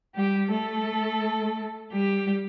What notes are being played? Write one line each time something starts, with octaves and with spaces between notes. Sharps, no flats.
G3 G4
A3 A4
G3 G4